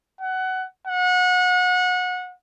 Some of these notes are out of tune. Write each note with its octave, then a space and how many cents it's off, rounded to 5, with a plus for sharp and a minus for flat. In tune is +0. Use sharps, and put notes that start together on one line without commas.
F#5 +20
F#5 -30